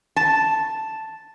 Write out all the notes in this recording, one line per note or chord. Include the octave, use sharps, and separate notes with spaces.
A5